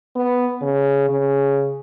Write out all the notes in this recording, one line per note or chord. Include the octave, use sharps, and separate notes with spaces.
B3
C#3
C#3